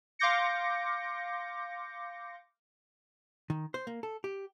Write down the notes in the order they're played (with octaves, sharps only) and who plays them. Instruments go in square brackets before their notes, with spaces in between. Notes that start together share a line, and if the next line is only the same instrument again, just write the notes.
[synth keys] F5 C6 D6 G6 A#6 C#7
[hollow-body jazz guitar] D#3
C5
A#3
A4
G4